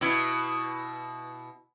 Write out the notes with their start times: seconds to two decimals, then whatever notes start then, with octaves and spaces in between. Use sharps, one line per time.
0.01 B2 E4